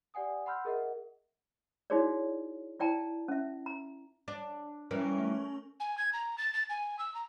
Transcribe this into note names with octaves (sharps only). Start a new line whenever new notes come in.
G4 D5 F#5 G#5 D#6
F#5 B5 C6 E6 F6 G6
G#4 A#4 D#5 E5 F#5
D#4 E4 F#4 G#4 C#5 D5
E4 D5 G5 A5 A#5
C#4 E5
A#5
D4
E3 G3 C#4 A#4
A3
G#5
G#6
A#5
A6
A6
G#5
E6
A#5